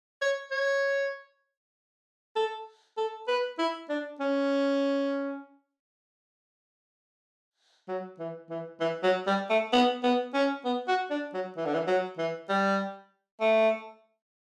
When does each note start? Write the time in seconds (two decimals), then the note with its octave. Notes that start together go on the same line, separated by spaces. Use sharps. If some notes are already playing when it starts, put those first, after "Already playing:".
0.22 C#5
0.51 C#5
2.36 A4
2.98 A4
3.28 B4
3.59 E4
3.90 D4
4.20 C#4
7.88 F#3
8.19 E3
8.50 E3
8.81 E3
9.03 F#3
9.27 G3
9.50 A3
9.73 B3
10.03 B3
10.34 C#4
10.65 B3
10.88 F#4
11.11 D4
11.34 F#3
11.57 E3
11.65 D3
11.74 E3
11.87 F#3
12.18 E3
12.49 G3
13.41 A3